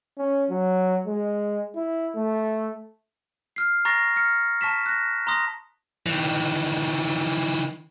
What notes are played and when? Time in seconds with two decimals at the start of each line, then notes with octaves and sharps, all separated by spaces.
0.18 C#4
0.50 F#3
1.07 G#3
1.76 E4
2.16 A3
3.56 F6 C7
3.85 A#5 C#6 A6 A#6 C7
4.16 F6 C#7
4.61 A5 C#6 B6 E7
4.86 F#6 A#6
5.27 A#5 C6 D#6 A#6
6.06 D#3 E3